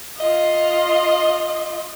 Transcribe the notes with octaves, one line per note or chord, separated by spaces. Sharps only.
F4 D#5